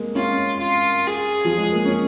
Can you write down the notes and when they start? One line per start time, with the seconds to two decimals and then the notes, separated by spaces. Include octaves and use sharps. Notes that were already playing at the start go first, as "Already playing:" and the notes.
Already playing: G#3 A#3
0.15 C#4 F4
0.60 F4
1.07 G#4
1.45 F3
1.57 G#3
1.72 A#3
1.85 C#4